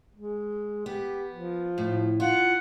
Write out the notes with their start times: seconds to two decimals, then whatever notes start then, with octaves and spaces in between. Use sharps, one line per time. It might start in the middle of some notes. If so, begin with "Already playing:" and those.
0.16 G#3
0.86 B3 G4
1.30 F3
1.78 A2
2.20 F4 F#5